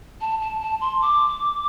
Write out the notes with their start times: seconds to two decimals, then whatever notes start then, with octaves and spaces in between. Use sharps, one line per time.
0.21 A5
0.41 A5
0.61 A5
0.81 C6
1.02 D6